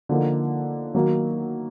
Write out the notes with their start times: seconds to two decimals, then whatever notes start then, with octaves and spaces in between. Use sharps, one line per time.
0.09 D3 F3 A#3 D#4
0.95 D#3 F#3 A#3